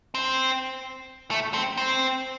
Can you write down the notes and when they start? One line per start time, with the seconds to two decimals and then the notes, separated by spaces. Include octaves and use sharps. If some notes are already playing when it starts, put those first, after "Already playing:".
0.15 C4
1.31 A3
1.54 C4
1.77 C4